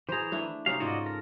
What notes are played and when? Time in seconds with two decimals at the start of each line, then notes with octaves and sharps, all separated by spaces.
0.09 E3 G#4 C5 A#5
0.32 A3 D4 E4
0.66 C3 C#4 D#4 F5
0.80 G#2 C#3 F4 F#4 D5 D#5
1.06 A4 A#4